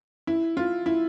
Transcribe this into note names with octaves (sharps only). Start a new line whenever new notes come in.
E4
F4
E4